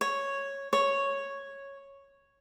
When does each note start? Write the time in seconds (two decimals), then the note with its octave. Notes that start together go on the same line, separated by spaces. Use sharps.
0.01 C#5
0.73 C#5